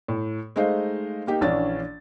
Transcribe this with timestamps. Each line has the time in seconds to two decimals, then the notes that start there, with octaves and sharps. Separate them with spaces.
0.08 A2
0.56 G#3 A3 D#4 C5 D#5 F5
1.27 A#3 D#4 G4
1.41 A#1 E3 C#4 D4 D5 A6